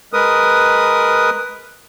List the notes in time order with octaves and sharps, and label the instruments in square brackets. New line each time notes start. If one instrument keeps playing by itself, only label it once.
[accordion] G#3 A#4 B4 D#6